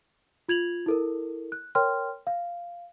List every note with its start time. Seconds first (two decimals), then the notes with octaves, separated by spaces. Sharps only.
0.49 F4 G#6 F7 F#7
0.86 E4 A4 A#4
1.52 F#6
1.75 A#4 C#5 G5 C6 F6
2.27 F5